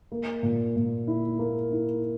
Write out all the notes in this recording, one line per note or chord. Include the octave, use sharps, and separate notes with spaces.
A#3
A#2
A#2
E4
A#3
E4